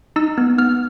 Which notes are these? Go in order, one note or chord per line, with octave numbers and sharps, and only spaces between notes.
D#4 E6
B3
B3 F6